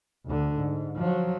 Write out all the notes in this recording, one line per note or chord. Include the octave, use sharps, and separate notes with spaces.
D2 D3
G#2
F3 F#3